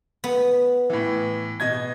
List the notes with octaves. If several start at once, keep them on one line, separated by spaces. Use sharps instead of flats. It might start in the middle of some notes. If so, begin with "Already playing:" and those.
B3
A2 E3
B2 D#5 G#6